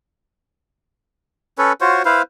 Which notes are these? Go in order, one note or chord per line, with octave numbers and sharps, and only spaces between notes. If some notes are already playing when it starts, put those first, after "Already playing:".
C#4 A4 B4 C#5
F4 F#4 C5 C#5
E4 B4 C5 F5